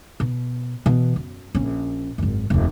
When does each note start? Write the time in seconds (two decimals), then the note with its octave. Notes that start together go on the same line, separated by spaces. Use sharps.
0.20 B2
0.86 B2 E3
1.16 F#2
1.55 A#1 C#4
2.18 G#1 F#2
2.50 F1 D#2